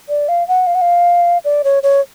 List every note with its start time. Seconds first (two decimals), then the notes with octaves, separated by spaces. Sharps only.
0.09 D5
0.29 F5
0.48 F#5
0.67 F5
0.75 F#5
0.81 F5
1.45 D5
1.64 C#5
1.83 C#5